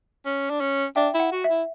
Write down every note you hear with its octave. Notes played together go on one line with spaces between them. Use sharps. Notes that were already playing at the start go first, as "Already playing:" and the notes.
C#4
D4
C#4
D4 E5 G5
E4
F#5
F#4
E5
E4